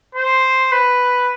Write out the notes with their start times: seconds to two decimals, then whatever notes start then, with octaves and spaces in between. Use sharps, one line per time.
0.15 C5
0.72 B4